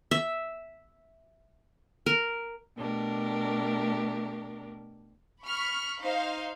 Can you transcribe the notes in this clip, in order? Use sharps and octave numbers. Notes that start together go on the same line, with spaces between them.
E5
A#4
B2 A3 D4 G4 A#4
B5 C#6 F6
D#4 C5 F5